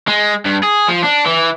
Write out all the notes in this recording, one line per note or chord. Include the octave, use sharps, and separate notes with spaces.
G#3
G2
G#4
F3
D4
E3